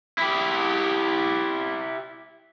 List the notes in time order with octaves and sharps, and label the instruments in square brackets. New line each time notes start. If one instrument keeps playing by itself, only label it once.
[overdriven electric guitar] E4 G4